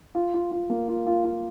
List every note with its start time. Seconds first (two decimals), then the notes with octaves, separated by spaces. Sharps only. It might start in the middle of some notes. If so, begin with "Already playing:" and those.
0.15 F4
0.34 F4
0.51 F4
0.70 A#3
0.88 F4
1.07 F4
1.24 F4